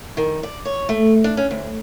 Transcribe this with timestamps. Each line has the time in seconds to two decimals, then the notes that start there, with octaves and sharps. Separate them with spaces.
0.17 D#3
0.43 D5
0.65 C#5
0.89 A3
1.24 D4
1.37 C#4
1.51 D2